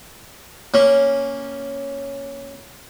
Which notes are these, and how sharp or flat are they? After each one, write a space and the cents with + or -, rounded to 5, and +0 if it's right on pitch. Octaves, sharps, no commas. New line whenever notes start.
A#3 +0 C#4 +0